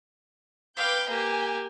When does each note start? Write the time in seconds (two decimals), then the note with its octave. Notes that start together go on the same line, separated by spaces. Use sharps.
0.77 B4 F5 G5 D6 G6
1.09 A#3 G4 G#5